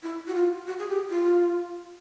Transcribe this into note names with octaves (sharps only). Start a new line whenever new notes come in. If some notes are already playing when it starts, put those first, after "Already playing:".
E4
F#4
F4
F#4
G#4
G4
F4